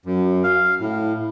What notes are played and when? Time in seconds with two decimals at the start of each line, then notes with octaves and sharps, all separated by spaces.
0.06 F#2
0.44 F5
0.80 A2